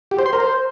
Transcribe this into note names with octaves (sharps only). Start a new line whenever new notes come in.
G4
C5
C6
A#4
C5